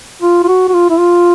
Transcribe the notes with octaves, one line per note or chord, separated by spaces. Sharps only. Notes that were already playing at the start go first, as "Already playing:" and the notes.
F4
F4
F#4
F#4
F4
E4
F4